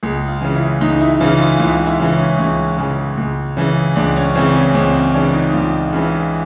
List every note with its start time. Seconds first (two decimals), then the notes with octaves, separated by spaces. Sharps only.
0.03 C#2 G#4
0.28 F4
0.41 C#3 E3
0.55 E4
0.81 C#2 D#4
1.01 E4
1.20 C#3 E3 F4
1.40 F4
1.59 C#2 E4
1.86 E4
1.99 C#3 E3
2.13 C#4
2.38 C#2 C#4
2.78 C#3 E3
3.17 C#2
3.57 C#3 E3
3.96 C#2 D4
4.16 C#4
4.35 C#3 E3 C4
4.54 C#4
4.74 C#2 C4
4.94 C#4
5.14 C#3 E3 D4
5.34 D#4
5.53 C#2 F4
5.93 C#3 E3